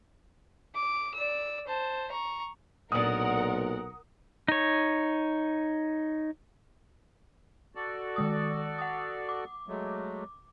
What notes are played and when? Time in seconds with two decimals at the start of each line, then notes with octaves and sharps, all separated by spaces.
0.75 D6
1.14 D5 E6
1.67 C5 A5
2.11 A#5 C#6
2.92 B1 A#2 D4 A#4 F#5 D#6
4.48 D#4 C#5
7.75 F#4 A4 D5
8.16 D#3 G#3 D#6
8.78 F#5 D#6
9.29 D6
9.68 F#3 G#3 A3